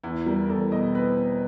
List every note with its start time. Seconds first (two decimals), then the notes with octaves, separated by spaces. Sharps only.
0.04 E2 E4
0.26 G3 A#4
0.44 A#4
0.49 E2 A4
0.72 B2 D#5
0.94 C4 B4
1.17 C4